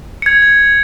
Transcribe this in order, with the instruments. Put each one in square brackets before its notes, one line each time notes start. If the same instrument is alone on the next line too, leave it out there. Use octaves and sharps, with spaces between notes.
[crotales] G#6 C#7
G#6